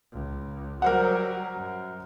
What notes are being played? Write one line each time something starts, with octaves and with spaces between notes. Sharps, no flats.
C#2
F#3 G3 A#4 C5 F#5
F#2